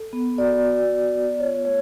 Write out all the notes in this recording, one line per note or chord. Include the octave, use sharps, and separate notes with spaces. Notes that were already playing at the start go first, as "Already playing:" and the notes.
Already playing: A4
B3
F#4 D5
F#4
B3
B3
F4 C#5
A3 C#5